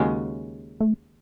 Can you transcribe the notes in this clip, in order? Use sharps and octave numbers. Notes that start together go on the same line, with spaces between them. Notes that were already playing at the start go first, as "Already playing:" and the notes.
Already playing: D#2 C#3 G#3 C#4 F#4
A3